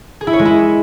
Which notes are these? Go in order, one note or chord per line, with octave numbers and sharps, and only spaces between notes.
G#4
E4
C#5
G#3
E4